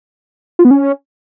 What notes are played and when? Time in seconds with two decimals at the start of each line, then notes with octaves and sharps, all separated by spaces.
0.59 F4
0.65 B3
0.71 C#4